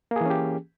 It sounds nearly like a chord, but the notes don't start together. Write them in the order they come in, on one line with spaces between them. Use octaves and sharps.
A#3 G#4 E3 C#4 G4